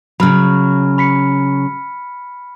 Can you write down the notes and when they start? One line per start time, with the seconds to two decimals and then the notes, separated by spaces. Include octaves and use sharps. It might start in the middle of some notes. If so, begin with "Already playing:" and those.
0.20 C#3 F#3 B5 F6
0.98 B5 B6 C#7